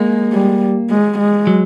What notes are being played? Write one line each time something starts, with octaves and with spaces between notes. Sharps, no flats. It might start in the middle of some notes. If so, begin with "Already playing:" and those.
Already playing: G#3 A#3
G3
G#3
G#3
F#3